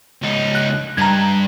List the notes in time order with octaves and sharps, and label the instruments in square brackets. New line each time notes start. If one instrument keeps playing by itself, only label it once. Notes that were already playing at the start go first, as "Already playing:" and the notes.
[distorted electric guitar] C#2 D#4
[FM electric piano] F#6
[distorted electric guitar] G2 [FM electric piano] A#5 G#6